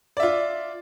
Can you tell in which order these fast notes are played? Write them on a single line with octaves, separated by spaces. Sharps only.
D5 E5 F4